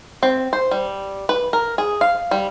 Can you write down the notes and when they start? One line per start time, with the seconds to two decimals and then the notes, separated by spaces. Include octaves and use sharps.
0.23 C4
0.53 C5
0.71 G3
1.29 B4
1.53 A#4
1.78 G#4
2.01 F5
2.31 G3